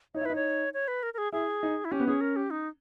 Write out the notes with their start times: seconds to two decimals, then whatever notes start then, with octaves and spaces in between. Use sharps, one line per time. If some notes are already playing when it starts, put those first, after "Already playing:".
0.14 D#4 C#5
0.21 E4
0.25 D#4 B4
0.35 C#5
0.74 C#5
0.88 B4
1.03 A#4
1.14 A#4
1.18 G#4
1.32 E4 G#4
1.63 D#4
1.85 E4
1.92 C#4 G4
2.00 B3
2.07 C#4 G#4
2.21 A#4
2.36 G4
2.50 D#4